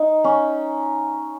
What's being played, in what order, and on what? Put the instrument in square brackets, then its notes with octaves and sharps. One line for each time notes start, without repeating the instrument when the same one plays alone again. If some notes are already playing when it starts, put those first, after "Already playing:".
Already playing: [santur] D#4
C#4